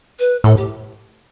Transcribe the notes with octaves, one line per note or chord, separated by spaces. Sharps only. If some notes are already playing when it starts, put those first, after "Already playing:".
B4
A2 A4
G4